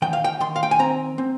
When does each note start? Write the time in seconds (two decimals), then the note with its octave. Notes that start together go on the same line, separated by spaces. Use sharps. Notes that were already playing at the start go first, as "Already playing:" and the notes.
0.02 D#3 G5
0.13 F5
0.24 G5
0.40 D#3 C6
0.56 F5
0.63 G5
0.71 G#5
0.79 C4 A#5
1.18 C4